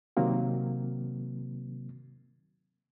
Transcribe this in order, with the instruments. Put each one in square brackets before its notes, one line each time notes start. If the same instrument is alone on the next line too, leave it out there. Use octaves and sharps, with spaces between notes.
[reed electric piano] C3 D#3 F#3 A#3 C4